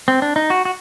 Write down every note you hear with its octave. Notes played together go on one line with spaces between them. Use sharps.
C4
D4
D#4
F#4
F#4